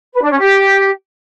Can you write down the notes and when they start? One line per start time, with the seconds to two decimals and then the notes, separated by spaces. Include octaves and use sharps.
0.14 B4
0.22 D4
0.30 C#4
0.39 G4